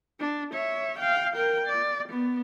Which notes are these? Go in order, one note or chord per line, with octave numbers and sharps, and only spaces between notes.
D4
C#5 E5
F5 G5
A#4 G5
D5
B3